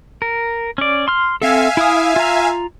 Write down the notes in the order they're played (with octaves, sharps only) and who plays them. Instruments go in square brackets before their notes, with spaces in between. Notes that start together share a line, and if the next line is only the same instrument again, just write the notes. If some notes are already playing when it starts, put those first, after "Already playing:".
[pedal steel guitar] A#4
C#4 D5
C6 F6
[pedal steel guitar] C4 A4 [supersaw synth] E5 F5 G#5
[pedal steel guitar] E4 D#6
F4 A#5